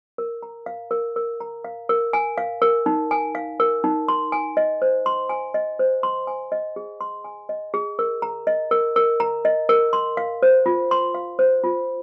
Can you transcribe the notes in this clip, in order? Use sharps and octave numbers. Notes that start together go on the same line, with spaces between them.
A#4
A#5
F5
A#4
A#4
A#5
F5
A#4
G#5
F5
A#4
D#4
G#5
F5
A#4
D#4
C6
G#5
D#5
C5
C6
G#5
D#5
C5
C6
G#5
D#5
G#4
C6
G#5
D#5
G#4
A#4
A#5
D#5
A#4
A#4
A#5
D#5
A#4
C6
F5
C5
F4
C6
F5
C5
F4